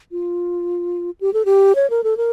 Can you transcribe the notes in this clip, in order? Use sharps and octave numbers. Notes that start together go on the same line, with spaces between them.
F4
G4
A4
G4
C#5
A#4
A4
A#4